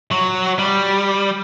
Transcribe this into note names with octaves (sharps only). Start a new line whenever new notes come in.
F#3
G3